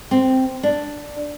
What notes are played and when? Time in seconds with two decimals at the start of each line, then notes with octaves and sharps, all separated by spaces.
0.11 C4
0.63 D4